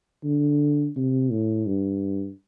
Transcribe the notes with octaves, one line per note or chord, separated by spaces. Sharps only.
D3
C3
A2
G2